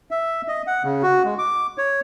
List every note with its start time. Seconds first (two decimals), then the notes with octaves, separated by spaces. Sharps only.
0.11 E5
0.48 D#5
0.67 F#5
0.84 C#3
1.03 F#4
1.25 G#3
1.39 D6
1.78 C#5